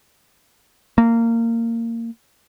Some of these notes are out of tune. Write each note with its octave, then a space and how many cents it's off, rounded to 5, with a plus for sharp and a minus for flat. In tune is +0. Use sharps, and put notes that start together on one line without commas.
A#3 -20